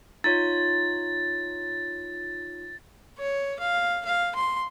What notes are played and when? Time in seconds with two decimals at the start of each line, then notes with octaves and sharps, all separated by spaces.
0.24 D#4 F4 C#5 A6
3.19 C#5
3.60 F5
4.06 F5
4.35 C6